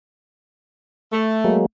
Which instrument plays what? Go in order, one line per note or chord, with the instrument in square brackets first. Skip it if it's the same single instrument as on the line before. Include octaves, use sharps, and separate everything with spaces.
[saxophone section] A3
[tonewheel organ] F#3 G#3 A#3